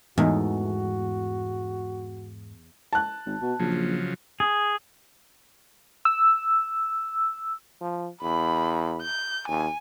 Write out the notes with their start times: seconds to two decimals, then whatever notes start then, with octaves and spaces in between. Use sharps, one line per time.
0.18 E2 G#2 G#3 A3 B3 D#4 F#4
2.93 A5 F#6
3.26 G#1
3.41 B2
3.59 A#1 C#3 F3 F#3
4.40 G#4
6.05 E6
7.81 F3
8.22 E2 B5
9.02 G6
9.48 D#2 G#5